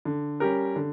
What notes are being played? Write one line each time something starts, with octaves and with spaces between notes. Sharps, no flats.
D3
G3 C#4 G4 A#4
D3